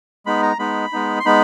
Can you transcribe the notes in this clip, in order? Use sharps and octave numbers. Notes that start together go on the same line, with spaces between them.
G#3 B3 D#4 B5
A#5
G#3 B3 D#4 B5
G#3 B3 D#4
C6
G#3 B3 D#4 B5